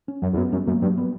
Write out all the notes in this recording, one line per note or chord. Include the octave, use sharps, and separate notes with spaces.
C#4
F#2 F#3
E2
F#2 B3
F#2 G3
F#2 A#3
G2 F#3
B3